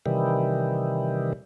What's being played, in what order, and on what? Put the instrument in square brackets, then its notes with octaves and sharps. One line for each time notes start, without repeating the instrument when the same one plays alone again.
[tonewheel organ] C3 D#3 E3 G3